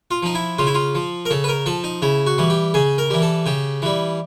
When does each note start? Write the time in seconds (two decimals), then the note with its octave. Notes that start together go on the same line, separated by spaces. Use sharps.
0.11 F4
0.23 F3 D#4
0.35 E4
0.59 C#3 F4
0.67 E4
0.75 F4
0.95 F3
1.26 A#4
1.30 C#3 A4
1.44 B4
1.48 A#4
1.66 F3 A4
1.84 D#4
2.02 C#3 E4
2.27 F#4
2.38 E3 G3
2.50 G4
2.74 C#3 G#4
2.98 A#4
3.10 E3 G3
3.22 A4
3.46 C#3 G4
3.82 E3 G3